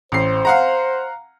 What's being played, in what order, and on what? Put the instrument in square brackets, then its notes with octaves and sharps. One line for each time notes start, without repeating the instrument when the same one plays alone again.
[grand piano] A1 C7 [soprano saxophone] C5
[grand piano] F5 F#5 A#5